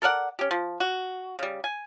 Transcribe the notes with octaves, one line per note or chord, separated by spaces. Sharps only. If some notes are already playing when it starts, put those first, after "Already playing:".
A4 A#4 D5 F#5
C#4 G4
F3
F#4
C#3 G3
G#5